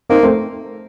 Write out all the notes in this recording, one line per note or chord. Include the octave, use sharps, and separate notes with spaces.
A#3 C4 D#4
A3 C4